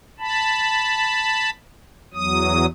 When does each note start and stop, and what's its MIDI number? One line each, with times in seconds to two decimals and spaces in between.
0.19 1.50 81
0.19 1.50 83
2.14 2.66 40
2.14 2.66 54
2.14 2.66 87